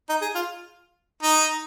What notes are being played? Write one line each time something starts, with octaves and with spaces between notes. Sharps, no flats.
D#4
G#4
F4
D#4